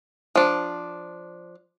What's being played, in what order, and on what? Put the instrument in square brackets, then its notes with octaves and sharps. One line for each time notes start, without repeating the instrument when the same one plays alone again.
[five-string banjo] F3 D4